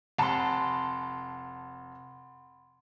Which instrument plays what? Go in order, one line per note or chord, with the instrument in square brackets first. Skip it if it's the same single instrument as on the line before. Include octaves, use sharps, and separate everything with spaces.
[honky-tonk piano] F1 A5 [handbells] F#5 B5 C6